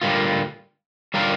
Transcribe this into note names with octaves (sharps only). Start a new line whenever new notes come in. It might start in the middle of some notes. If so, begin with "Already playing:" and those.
D3 G3 A#3 F4
D3 G3 A#3 F4 A#4